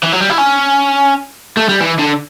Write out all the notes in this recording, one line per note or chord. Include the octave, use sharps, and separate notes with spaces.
E3
F#3
G3
E4
C#4
A3
G3
E3
D3